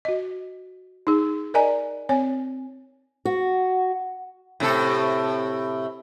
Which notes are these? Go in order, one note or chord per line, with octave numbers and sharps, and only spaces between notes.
F#4 D#5
D#4 G#4
A#4 D5 D#5 G#5 A#5
C4 C#5 G#5
F#4
A2 C3 A4